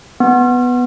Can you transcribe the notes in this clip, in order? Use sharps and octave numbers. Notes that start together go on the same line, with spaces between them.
B3